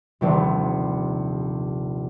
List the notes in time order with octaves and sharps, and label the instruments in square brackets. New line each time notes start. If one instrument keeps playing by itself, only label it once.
[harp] D#1 A#1 C3